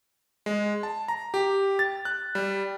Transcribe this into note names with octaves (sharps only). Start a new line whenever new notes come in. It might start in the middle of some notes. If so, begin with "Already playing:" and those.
G#3
A5
A#5
G4
A6
F#6
G3